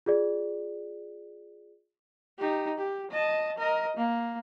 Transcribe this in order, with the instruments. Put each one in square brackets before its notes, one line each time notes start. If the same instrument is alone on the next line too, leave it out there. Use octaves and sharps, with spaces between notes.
[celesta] F4 G#4 D5
[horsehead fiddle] D#4 G4
G4
D#5 A5
A#4 D#5
A#3